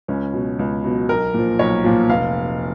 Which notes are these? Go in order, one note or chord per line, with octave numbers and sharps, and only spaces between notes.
C#2 C#4
B2 F#3
C#2
B2 F#3
B1 A#4
A#2 F3
B1 C#5
A#2 F3
F1 F5